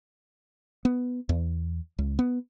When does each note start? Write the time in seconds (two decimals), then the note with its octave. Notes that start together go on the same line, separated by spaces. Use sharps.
0.85 B3
1.29 E2
1.99 C#2
2.19 B3